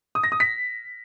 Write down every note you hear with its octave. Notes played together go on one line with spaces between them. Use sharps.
D#6
A#6
D#6
B6